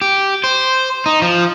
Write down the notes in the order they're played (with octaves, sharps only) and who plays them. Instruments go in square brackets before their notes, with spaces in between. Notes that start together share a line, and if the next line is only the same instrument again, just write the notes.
[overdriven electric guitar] G4
C5
D#4
F3